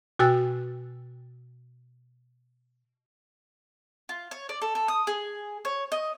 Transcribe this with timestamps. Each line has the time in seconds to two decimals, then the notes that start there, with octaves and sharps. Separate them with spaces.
0.19 B2 F#4 G5 G#5 E6 A6
4.09 F4
4.31 C#5
4.49 D5
4.62 A4
4.75 A4
4.88 D#6
5.07 G#4
5.65 C#5
5.92 D#5